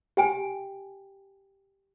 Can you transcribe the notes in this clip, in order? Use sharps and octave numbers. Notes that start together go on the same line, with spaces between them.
G4 G5 G#5